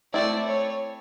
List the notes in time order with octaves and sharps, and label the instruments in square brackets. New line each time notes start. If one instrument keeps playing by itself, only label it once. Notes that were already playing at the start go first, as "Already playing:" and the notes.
[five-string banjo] A3 C4 E4 [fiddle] D5
[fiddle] C#5